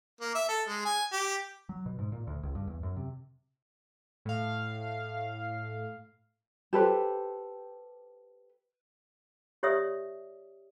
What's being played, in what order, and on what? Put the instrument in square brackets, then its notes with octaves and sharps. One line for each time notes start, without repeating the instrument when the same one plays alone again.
[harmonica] A#3
E5
A4
G#3
G#5
G4
[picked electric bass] F#3
B2
G#2
A#2
D2
C#2
G2
E2
F#2
C3
[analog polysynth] A2 F5
[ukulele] G4 A4 B4 C5
[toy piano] G4 C#5 D5 E5 D#6